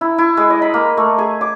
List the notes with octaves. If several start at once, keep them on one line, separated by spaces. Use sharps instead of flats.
E4
E4
G#3
D#5
B5
A#3
A3
G#4
D6